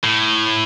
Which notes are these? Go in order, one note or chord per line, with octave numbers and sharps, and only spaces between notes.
A2